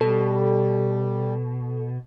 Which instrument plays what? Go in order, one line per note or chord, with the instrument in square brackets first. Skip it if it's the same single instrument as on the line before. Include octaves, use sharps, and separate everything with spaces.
[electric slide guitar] B2 [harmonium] G3 [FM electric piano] A4